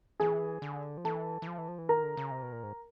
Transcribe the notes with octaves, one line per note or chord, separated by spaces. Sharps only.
E3 G#4 G#5
D3
F3
E3 A4 A5
E3
F3
E3
F3
E3
D#3 A#4 A#5
D3
C#3
C3
B2
A#2
G#2